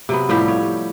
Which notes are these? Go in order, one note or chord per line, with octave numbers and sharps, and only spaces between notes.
C3 F#3 B3
A2 F3 G3 G4
C#5